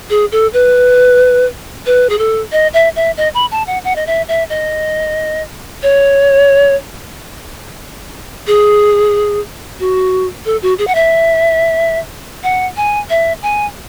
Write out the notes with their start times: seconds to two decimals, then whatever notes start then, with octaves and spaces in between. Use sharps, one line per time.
0.10 G#4
0.32 A4
0.53 B4
1.86 B4
2.09 G#4
2.18 A4
2.52 D#5
2.74 E5
2.96 E5
3.17 D#5
3.34 B5
3.51 A5
3.67 F#5
3.85 F#5
3.96 D#5
4.07 E5
4.28 E5
4.50 D#5
5.83 C#5
8.47 G#4
9.80 F#4
10.45 A4
10.62 F#4
10.79 G#4
10.87 F#5
10.95 E5
12.43 F#5
12.77 G#5
13.10 E5
13.43 G#5